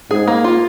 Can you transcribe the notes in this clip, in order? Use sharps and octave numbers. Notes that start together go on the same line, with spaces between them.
G#2 G#4
A#3
F4